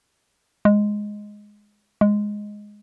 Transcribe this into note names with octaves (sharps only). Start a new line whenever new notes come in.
G#3
G#3